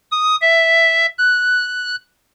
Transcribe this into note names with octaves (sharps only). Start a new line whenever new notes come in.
D#6
E5
F#6